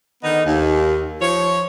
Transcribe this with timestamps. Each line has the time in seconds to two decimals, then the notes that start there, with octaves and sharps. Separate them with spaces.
0.23 D3 D#3 B3 D#4
0.46 D#2
1.21 F3 C#5